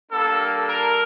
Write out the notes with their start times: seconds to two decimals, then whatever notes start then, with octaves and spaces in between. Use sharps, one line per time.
0.12 G3 A#3 D4 A4
0.66 A#4